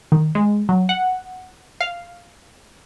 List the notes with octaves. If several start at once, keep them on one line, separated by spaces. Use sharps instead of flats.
D#3
G#3
F#3
F#5
F5